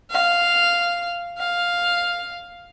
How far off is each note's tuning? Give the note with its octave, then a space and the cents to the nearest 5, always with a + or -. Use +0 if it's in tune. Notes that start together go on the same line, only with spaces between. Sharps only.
F5 -5
F5 +5